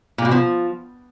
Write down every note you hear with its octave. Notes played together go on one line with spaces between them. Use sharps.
A#2
B2
F3